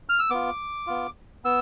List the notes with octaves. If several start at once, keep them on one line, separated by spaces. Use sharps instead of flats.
F6
E6
B3 F4 D6
B3 F4
B3 E6